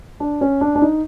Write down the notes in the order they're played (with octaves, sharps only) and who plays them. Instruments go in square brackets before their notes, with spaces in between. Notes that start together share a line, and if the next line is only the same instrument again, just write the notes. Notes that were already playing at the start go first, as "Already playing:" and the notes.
[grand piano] D4
C#4
D4
D4
D#4